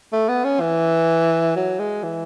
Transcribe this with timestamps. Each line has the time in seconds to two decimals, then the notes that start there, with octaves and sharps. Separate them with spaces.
0.13 A3
0.29 B3
0.44 C#4
0.60 E3
1.56 F#3
1.79 G#3
2.03 E3